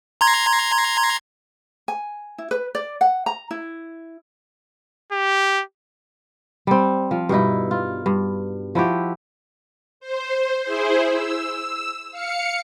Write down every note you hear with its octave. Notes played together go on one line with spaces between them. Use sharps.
A#5 C6 G#6
G#5
E4
B4
D5
F#5
A#5
E4
G4
G3 C4
F3 F5
G2 B2 D#4 E4
F4
G2
F3 E4 F#4 G4
C5
E4 G#4 C5
E6
F5 C#7